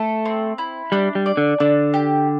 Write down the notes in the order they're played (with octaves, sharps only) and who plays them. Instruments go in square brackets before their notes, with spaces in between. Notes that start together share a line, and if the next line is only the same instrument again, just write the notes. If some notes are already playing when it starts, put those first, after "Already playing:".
Already playing: [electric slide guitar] A3 [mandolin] A4
[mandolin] C4
E4
[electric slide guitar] G3 [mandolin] D4
[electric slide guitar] G3
[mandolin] D5
[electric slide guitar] D3
[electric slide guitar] D3 [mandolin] D4
[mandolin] G4